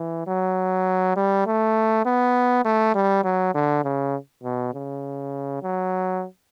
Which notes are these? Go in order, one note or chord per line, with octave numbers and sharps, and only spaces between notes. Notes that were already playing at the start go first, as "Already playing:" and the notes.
Already playing: E3
F#3
G3
A3
B3
A3
G3
F#3
D3
C#3
B2
C#3
F#3